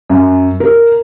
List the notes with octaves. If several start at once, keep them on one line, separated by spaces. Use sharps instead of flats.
F#2
A#4